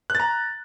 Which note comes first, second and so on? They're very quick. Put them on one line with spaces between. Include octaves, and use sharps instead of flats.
F#6 A6 A#5